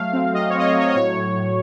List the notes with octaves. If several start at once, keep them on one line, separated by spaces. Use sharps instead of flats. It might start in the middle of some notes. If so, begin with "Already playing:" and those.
Already playing: F#3 A3 F5
C4
F#3 D#5
C#5
C4
D#5
C#5
F#3
C#5
D#5
A2 C#5
A2
A2